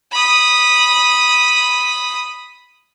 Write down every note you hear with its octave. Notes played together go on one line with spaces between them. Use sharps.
B5 D#6